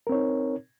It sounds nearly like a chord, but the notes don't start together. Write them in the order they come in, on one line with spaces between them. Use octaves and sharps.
A#4 C4 C#5 D#4